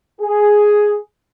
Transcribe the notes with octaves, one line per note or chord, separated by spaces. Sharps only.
G#4